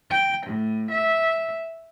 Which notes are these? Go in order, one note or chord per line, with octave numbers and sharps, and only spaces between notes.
G5
A2
E5